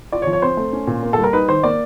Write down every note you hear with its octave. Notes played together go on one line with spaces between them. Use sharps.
F4 D5
C#5
F3
C#5
C4 C5
A3
C#4
A#2
A#3
G3 A4
A#4
D#4 B4
D#3 C5
A#3 D5